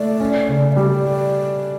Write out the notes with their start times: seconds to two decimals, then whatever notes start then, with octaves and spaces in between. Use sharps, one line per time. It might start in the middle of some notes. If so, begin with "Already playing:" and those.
Already playing: A3 E4 D5
0.20 C#4
0.49 C#3
0.71 E5
0.76 G3 D5